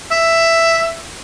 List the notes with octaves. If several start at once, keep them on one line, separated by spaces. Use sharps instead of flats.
E5